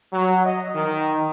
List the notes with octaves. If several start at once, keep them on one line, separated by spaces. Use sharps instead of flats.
F#3
D#5
D#3